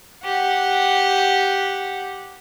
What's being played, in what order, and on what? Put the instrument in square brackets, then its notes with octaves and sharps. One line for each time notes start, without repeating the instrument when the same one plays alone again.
[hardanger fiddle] G4 F#5